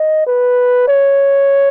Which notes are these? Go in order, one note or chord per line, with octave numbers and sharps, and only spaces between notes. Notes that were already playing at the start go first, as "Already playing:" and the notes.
Already playing: D#5
B4
C#5